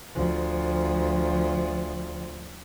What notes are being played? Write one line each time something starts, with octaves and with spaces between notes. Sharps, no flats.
D2 F3